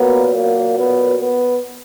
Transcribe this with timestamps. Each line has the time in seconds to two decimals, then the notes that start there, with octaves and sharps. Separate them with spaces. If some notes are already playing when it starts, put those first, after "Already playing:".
Already playing: A#2 F#3 A#3 B3
0.32 A#3
0.75 B3
1.18 B3